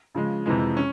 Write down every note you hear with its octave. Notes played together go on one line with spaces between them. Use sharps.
C#3 F3 G#3
F2 C3 E3 G#3
C#4